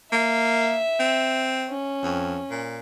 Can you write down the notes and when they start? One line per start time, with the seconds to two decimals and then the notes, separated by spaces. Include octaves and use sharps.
0.12 A#3 E5
1.00 C4
1.69 C#4
2.03 F2
2.50 A#2